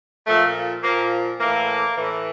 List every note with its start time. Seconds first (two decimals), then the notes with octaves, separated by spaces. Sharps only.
0.27 A#2 F3 A3
0.83 A#2 F3 A#3
1.40 A2 E3 A#3
1.97 A2 E3